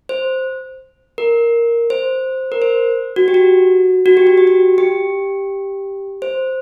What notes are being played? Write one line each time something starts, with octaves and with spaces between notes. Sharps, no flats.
C5
A#4
C5
A#4
C5
F#4
G4
F#4
F#4
G4
F#4
G4
F#4
G4
C5